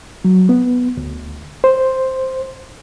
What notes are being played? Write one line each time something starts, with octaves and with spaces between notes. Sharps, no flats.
F#3
B3
D2
C5